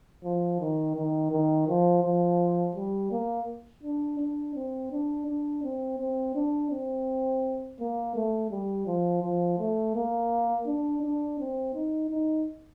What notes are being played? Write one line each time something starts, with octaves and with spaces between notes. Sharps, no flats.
F3
D#3
D#3
D#3
F3
F3
G3
A#3
D4
D4
C4
D4
D4
C4
C4
D4
C4
A#3
A3
G3
F3
F3
A3
A#3
D4
D4
C4
D#4
D#4